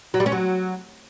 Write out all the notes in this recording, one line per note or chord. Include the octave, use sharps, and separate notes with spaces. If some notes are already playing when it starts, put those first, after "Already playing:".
F#3
G3
C#4
F#3